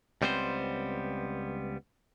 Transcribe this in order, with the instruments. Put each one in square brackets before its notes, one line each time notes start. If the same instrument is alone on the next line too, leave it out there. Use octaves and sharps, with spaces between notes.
[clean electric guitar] C#2 G3 B3 C4 C5